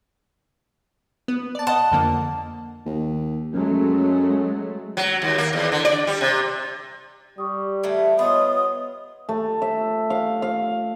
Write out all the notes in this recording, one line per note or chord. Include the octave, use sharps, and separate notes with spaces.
B3
D5 A5
D#5 F#5 A5
F2 D3 A#3
D#2
F#2 F#3 G#3 A3
F#3
D#2
A#3
E2
D3
D5
G3
C3
G3 C#6 D#6
A2 E3 A3
B3 F4 C#5 D#5 B5 D#6
A3
E5
F5
F5